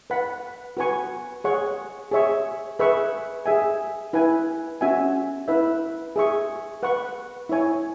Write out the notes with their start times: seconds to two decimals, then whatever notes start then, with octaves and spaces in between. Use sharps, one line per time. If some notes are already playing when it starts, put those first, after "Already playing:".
0.10 B4 F#5 B5
0.77 F#4 B4 G#5 C#6
1.44 G#4 C#5 F#5 C#6
2.11 G#4 C#5 E5 C#6
2.79 G#4 B4 E5 C#6
3.46 G#4 E5 G#5
4.13 E4 B4 G#5
4.81 C#4 F#4 E5 G#5
5.48 E4 B4 E5
6.16 G#4 E5 C#6
6.83 B4 F#5 C#6
7.49 E4 C#5 G#5